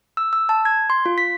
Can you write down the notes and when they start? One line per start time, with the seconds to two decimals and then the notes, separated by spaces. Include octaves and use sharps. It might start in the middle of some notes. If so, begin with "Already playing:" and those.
0.17 E6
0.33 E6
0.49 A5
0.65 G#6
0.90 C6
1.06 F4
1.18 B6